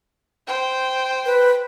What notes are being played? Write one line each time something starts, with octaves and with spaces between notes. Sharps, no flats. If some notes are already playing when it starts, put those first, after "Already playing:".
C5 G5
B4